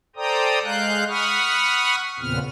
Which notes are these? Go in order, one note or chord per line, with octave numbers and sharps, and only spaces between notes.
A4 C5 D5 G5 A#5 D#6
G#3 F5 F#6 G6
F#5 B5 C#6 D#6 F6
E2 A#2 C#3 B3 C4 F6